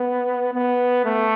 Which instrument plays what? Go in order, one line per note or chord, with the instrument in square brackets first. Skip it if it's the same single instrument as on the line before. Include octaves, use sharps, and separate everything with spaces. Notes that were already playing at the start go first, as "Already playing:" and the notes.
Already playing: [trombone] B3
B3
A3